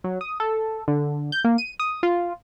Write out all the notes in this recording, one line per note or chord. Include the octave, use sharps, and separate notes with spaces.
F#3
D#6
A4
D3
G6
A#3
D#7
D#6
F4